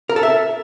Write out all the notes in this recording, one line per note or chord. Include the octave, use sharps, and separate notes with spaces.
A#4
A4
E5